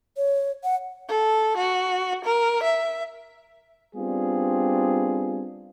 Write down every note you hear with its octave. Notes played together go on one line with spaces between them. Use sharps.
C#5
F#5
A4
F#4
A#4
E5
G3 B3 C4 D4 F4 G#4